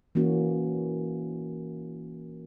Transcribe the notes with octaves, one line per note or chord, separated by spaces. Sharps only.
E3 A#3 C#4 F#4